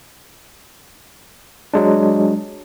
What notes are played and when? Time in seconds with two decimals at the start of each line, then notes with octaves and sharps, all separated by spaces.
1.74 F#3 G#3 D4